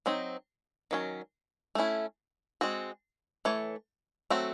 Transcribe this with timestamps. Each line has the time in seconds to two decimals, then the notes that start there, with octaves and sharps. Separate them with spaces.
0.06 F#3 C4 D#4
0.91 D#3 F#3 C#4
1.75 A3 C#4 E4
2.61 G#3 C4 F#4
3.45 E3 A3 C#5
4.30 F#3 A3 C4 F#4